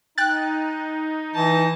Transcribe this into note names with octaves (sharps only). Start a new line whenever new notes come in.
D#4 G5 F#6 A6
E3 A5 A#6